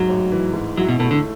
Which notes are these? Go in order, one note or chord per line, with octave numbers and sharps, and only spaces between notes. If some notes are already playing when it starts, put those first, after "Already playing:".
Already playing: G#2 F#3
A1
E3
G#2
F#3 E4
B2
B2 A3
D3